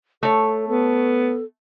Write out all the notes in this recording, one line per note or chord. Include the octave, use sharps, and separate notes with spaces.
A3 A4 C#5
B3 A4